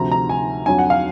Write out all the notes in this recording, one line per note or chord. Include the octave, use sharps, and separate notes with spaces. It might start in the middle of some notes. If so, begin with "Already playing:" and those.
Already playing: D2 C3 F3 A#5
A#5
G#5
F2 D3 F#3 G#5
F#5
F5